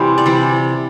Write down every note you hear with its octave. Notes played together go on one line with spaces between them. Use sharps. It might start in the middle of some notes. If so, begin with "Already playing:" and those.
Already playing: C3 E3 G3 G4 C5
D5
C3 E3 G3 C5